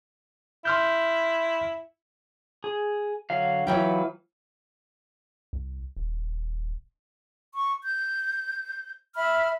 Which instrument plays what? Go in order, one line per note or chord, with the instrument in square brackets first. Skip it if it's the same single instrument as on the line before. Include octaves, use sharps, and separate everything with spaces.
[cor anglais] E4 [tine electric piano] C6 F6 G6
[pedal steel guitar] G#4
D3 F#3 F5
[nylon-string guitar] E3 F#3 G5 [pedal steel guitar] F4 B4
[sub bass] C2
D#1
[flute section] C#6
G6
E5 B5 F6